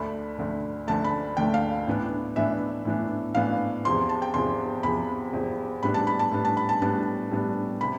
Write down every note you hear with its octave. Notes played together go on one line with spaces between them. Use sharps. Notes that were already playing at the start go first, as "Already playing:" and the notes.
Already playing: D2 D3 A3 B5
D2 D3 A3
D2 D3 A3 A5
B5
D2 D3 A3 G5
F5
A2 E3 B3 D4
A2 E3 B3 D4 E5
A2 E3 B3 D4
A2 E3 B3 D4 F5
E2 C3 F3 C6
A5
G5
E2 C3 F3 C6
E2 C3 F3 B5
E2 C3 F3
A2 G3 B3 D4 B5
A5
B5
A5
A2 G3 B3 D4
A5
B5
A5
A2 G3 B3 D4 A5
A2 G3 B3 D4
C3 B5